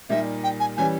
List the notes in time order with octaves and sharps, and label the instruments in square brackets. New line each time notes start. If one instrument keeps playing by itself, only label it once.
[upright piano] A#2 G3 A#3 D#4 G4 [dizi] E5
[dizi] G5
G#5
[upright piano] E3 G3 C#4 [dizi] G#5